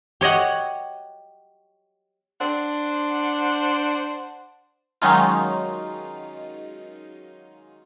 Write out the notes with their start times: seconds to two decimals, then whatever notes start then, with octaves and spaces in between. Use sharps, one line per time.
0.21 G4 C#5 D#5 F#5
2.40 D4 C5 F#5
5.02 D#3 F#3 G#3 C#4 D#4 F4